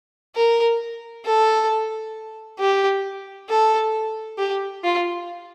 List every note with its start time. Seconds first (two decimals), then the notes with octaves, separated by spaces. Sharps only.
0.35 A#4
1.25 A4
2.59 G4
3.49 A4
4.38 G4
4.83 F4